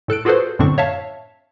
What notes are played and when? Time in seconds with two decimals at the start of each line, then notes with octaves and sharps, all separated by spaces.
0.08 A2 A4 F#6 D7
0.25 F4 F#4 G#4 A4 B4 C5
0.59 F#2 A2 D3 C4 D4 C#6
0.78 C#5 E5 F5 A5